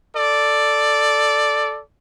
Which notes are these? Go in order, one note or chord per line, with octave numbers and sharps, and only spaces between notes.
A4 D5